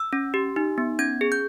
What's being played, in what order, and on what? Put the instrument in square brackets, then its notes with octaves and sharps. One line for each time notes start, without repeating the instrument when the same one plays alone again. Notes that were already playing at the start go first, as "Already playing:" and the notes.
Already playing: [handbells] E6
C#4
G4
D#4
B3
C#4 G#6
G#4
G6